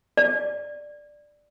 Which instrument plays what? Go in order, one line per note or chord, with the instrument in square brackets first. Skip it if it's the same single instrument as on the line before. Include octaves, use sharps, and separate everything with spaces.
[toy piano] D5